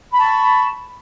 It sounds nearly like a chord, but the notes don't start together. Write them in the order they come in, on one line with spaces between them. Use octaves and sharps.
B5 A5 C#6